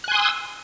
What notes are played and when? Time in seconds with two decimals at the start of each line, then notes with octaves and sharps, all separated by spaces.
0.04 F#6
0.08 G#5
0.11 C6
0.15 D#6
0.19 E6